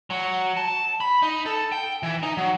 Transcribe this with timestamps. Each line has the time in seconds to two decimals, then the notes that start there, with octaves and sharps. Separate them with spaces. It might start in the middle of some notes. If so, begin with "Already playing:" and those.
0.10 F#3
0.57 A5
1.01 B5
1.22 D#4
1.46 A4
1.72 G5
2.03 E3
2.23 D#4
2.37 F#3